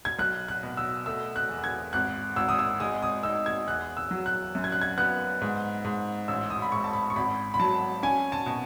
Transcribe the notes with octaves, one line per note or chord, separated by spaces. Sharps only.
G#6
B1 F#6
F#6
B2
E6
A3 E6
F#6
E2
G#6
G#1 F#6
G#1 E6
D#6
E6
G#3 D#6
D#6
D#4 E6
G#6
E2 F#6
E6
F#3
F#6
F#2
G#6
F#6
G#6
B3 F#6
G#2
G#2
A1 E6
D#6
B5
G#2 C#6
A5
B5
C#6
G#1 B5
B5
F#3 A5
C#4 G#5
A5
B2